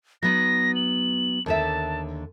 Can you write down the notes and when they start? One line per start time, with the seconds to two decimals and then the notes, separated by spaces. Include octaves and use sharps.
0.23 F#3 B3 D#4 A#6
0.75 F#7
1.46 D#2 D3 E5 A5